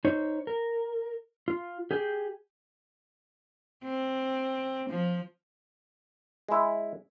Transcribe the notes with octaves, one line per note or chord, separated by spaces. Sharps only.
D#4 C5 C#5
A#4
F4
G4 G#4 G5
C4
F3
G#3 E4